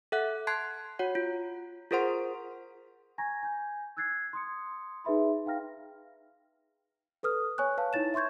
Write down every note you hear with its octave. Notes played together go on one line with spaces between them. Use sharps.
A4 E5 F#5 F#6
A5 C6 F#6 G#6 C7
F#4 C#5 F#5
F4
F4 G#4 A#4 C5 F#5 C6
G#5 A#5 C#6 G#6 A#6
G#5 G6
E6 F#6 G#6 A6 C7
C6 D#6 C#7
D#4 G#4 B4 E5 B5 C6
D#4 F5 G5 A#5 F6 A#6
A4 B4 D#6 F6
C#5 G#5 C#6 F#6
B4 C#5 F5 A5
D#4 E4 C#5 A6 E7
E5 C6 C#6 G6 G#6